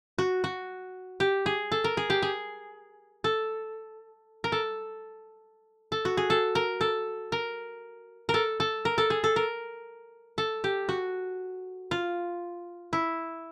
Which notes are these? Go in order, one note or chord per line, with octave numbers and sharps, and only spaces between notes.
F#4
F#4
G4
G#4
A4
A#4
G#4
G4
G#4
A4
A#4
A4
A4
F#4
G#4
A4
A#4
A4
A#4
A#4
A4
A4
A#4
A4
G#4
A4
A#4
A4
G4
F#4
F4
E4